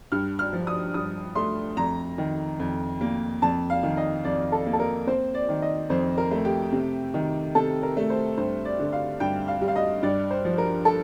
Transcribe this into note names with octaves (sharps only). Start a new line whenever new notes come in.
G2 F6
F6
F3
D#6
G2 D#6
A3 C6
F2 A#5
D#3
F2
A#3
F2 A5
F5
D#3
D#5
F2 D5
A4
A#3
A4
A#4
C4 C5
D5
D#3
D#5
F2 C5
A#4
A3
G4
C3
D#3
C3 A4
A#4
A3
C5
G2 C5
D5
D3
F5
G2 G5
F5
G3
F5
D#5
G2 D5
C5
F3
A#4
A4